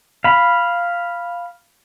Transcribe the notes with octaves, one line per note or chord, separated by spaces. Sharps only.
F5 B5